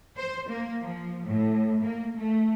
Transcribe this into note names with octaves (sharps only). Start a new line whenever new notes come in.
C5
A#3
F3
A2
A#3
A3